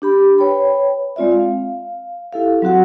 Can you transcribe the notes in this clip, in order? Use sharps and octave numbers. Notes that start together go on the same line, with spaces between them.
D4 G4 B5
B4 C#5 G5 B5
G#3 C4 F4 D5 E5
F5
E4 G4 A4 E5 F5
F#3 C4 F#4 F#5